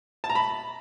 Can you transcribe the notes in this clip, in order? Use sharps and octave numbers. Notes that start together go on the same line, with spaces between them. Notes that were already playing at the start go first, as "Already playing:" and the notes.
A5
A#5
B5